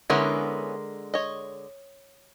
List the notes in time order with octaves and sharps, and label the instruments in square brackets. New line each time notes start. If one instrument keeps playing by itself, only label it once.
[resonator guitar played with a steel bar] D3 G#3 A#4 [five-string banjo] B3 C#4 E4
[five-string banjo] C#5 D#5